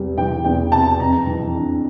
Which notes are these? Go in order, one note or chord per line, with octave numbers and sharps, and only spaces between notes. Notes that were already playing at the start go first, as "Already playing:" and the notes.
Already playing: E2 C3 G3
E3 G5
E2 G5
C3 A5
F2 A#5
E3
D4